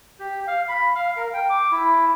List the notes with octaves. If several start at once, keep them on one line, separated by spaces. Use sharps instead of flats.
G4
F5
B5
F5
A#4
G5
D6
E4